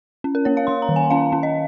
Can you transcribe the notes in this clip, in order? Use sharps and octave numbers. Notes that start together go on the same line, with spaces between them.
C#4
A#4
A#3 C#5
F5
A#3 C6
A#5
D#3
G#5
C#4 F5
C#4
D#5